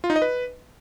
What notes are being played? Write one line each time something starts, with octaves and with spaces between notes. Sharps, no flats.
F4
D#4
D#5
B4